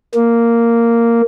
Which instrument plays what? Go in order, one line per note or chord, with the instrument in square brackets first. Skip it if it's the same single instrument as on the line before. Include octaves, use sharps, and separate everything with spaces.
[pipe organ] A#3